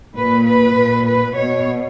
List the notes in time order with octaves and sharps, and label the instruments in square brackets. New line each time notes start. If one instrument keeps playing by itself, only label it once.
[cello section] A#2 B4
B4
A#2
B4
B2 C#5